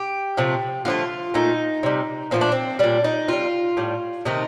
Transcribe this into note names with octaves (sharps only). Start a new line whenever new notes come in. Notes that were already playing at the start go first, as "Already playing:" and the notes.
Already playing: G4
C3 F3 A3
D3 F3 A3 F4
A#2 A3 D#4
C3 G3
A#2 F3 A3 C4
D4
C4
A#2 G3 D4
D#4
C3 G3 F4
A2 G3
C3 D#3 A3 D#4